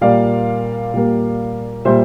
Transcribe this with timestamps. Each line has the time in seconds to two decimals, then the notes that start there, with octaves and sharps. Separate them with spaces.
0.01 A#2 G3 A#3 D5 F5
0.94 A#2 G3 A#3
1.85 A#2 G3 A#3 C5 E5